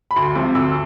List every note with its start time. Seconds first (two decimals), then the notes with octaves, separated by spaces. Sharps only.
0.11 B5
0.16 D2 C6
0.35 C3 F3
0.55 D2 E6